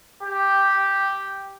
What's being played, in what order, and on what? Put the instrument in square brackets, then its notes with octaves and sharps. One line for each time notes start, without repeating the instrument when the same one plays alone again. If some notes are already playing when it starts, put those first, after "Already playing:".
[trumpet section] G4